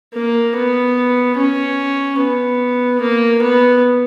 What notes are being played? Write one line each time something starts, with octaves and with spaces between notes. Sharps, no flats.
A#3
B3
C#4
B3
A#3
B3